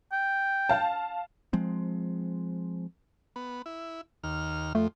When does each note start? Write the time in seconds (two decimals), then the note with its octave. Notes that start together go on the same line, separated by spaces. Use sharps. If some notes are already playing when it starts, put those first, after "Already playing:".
0.12 G5
0.69 F5 A5
1.53 F3 G#3 C4
3.36 B3
3.66 E4
4.24 D#2 F6
4.75 F2 A3